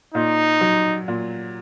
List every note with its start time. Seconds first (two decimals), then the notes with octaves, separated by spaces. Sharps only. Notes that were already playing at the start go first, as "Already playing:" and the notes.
0.14 A#2 D#4
0.61 F#3
1.08 A#2